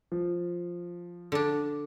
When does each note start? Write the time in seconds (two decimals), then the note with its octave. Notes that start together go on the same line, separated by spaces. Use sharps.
0.12 F3
1.32 D3 D4